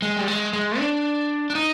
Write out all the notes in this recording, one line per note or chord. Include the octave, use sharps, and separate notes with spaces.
G#3
G3
G#3
G#3
D4
D4
D#4